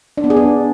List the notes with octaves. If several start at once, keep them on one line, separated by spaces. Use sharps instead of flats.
D4
B3
G#4
D4